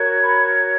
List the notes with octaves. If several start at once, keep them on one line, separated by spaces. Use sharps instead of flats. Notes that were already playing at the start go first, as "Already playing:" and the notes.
Already playing: F#4 A#4 C#5
B5